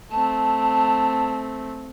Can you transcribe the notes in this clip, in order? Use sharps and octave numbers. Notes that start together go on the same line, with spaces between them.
A3 C4 A5